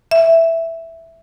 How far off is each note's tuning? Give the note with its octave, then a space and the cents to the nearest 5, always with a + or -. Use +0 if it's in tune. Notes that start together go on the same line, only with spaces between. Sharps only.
E5 +0